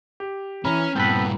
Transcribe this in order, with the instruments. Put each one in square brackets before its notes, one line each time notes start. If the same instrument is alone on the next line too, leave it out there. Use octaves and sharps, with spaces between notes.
[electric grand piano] G4
[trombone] E3 [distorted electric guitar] C#4 [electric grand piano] A#5 B5 F6
[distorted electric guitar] G2 A#2 [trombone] B3 [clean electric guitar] C4 A4 B4